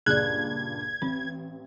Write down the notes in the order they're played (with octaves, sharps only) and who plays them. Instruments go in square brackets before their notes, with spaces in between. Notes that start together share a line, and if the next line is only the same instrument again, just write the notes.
[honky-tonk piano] C#2 G2 A#2 [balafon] G#4 D5 [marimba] F#6 [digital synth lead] G#6
[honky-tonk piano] A1 [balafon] C4